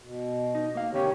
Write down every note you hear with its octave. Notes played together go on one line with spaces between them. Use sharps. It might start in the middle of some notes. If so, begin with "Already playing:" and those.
B2
D#4
A#3 F5
D2 B2 D#3 C#4 G4 C#5